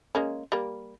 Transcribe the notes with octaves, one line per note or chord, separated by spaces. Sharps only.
G#3 A#3 C#4
G3 A#3